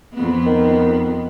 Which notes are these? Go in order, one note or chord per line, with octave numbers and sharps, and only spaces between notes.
F2 B3
D#3